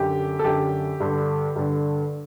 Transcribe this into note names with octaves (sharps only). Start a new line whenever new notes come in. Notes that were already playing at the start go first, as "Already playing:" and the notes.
Already playing: F#2 D3 G4
A4
F#2 D3 G4
G2 D3
G2 D3